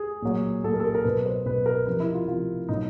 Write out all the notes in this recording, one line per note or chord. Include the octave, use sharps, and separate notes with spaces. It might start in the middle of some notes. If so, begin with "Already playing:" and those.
Already playing: G#4
A#2 F#3
A#2 F#3 A4
A#4
A4
A#4
A#4
B2 F#3 B4
C5
B2 F#3 B4
A#4
C3 F3 A#4
E4
F4
C3 F3 F4
B2 F#3 D#4